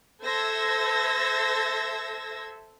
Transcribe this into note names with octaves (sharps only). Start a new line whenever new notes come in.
A4 C5 E5 E6 G#6 A#6